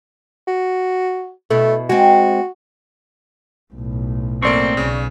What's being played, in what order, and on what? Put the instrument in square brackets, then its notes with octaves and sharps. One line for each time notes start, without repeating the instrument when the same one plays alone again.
[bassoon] F#4
[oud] B2 E4 [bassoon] A3
[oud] G#3 C4 [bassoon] F#4
[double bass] B1 A2
[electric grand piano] F#2 A3 A#3 [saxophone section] C4 [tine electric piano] D5 C#6
[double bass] B1 [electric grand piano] C#3